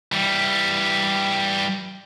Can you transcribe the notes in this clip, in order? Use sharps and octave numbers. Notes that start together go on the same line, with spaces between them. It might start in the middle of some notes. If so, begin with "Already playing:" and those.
E3 G3